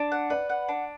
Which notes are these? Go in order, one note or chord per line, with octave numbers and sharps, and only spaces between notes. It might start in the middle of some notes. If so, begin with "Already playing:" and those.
Already playing: D4 D5
F#5
B4 D5
F#5
D4